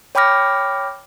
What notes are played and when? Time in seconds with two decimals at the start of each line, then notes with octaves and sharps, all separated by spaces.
0.15 C#5 G5 B5 D6 F6 A#6